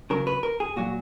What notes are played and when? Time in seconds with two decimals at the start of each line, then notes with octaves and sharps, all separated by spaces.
0.10 C#3 F#3 A#4
0.27 B4
0.43 A#4
0.60 G#4
0.76 A#2 F#3 F#4